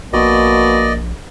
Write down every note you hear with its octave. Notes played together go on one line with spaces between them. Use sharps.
A#1 B2 A#3 D5 D#5